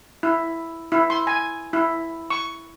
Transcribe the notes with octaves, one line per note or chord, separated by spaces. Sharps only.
E4
E4
C6
G#5
E4
C#6